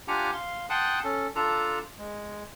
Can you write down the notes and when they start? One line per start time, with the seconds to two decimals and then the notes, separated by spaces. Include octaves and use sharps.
0.08 D4 F4 G4 F#5 G#5 A#5
0.33 F5 C6
0.70 F#5 G5 A5 C6 D#6 F#6
1.04 C#4 A4
1.35 D4 F4 A4 A#5 E6
1.98 G#3